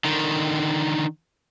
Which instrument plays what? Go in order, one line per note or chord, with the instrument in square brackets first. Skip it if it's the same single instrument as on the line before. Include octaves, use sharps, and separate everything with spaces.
[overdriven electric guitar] D3 D#3